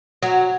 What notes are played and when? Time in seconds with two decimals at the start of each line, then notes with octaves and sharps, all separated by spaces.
0.22 F#3